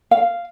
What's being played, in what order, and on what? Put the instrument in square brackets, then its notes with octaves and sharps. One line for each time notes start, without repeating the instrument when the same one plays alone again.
[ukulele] F5